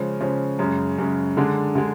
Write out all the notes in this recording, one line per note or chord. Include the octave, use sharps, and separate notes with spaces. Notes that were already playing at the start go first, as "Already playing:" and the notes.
Already playing: C#3 F3 G#3 C#4
C#3 F3 G#3 C#4
F#2 C#3 G#3
F#2 C#3 G#3
D3 G#3 D4
D3 G#3